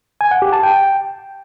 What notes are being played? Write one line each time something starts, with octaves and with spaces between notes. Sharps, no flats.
G#5
F#5
G4
A5
G5